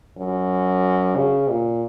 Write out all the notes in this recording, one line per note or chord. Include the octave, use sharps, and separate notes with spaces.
F#2
C#3
A#2